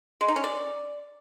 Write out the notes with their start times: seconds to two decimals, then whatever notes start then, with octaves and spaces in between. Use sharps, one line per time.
0.21 G#3
0.28 D#4
0.36 C#4
0.44 D5